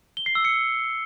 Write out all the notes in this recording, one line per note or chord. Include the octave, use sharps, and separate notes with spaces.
G7
C7
E6
C#7